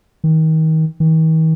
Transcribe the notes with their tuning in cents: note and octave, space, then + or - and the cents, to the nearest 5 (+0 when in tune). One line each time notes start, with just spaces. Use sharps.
D#3 +30
D#3 +45